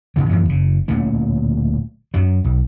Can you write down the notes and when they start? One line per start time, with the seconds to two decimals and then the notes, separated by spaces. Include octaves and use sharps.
0.16 G#2 C#3 F3
0.29 F#2 E3 F3 A3
0.49 F#1 C#3
0.88 D1 A#2 A3 C#4
2.14 F#2 F#3
2.44 B1